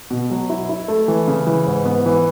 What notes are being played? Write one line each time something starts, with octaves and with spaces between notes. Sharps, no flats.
B2
F#3
E4
E4
A3
E3
C#3
E3
G#2
B3
E3